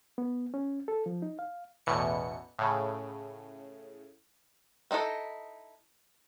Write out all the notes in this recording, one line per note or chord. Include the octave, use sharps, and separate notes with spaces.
B3
C#4
A4
F3
D#4
F5
A1 E2 B2 E3 C#7
A2 C#3
C4 D#4 E4 A4 D#5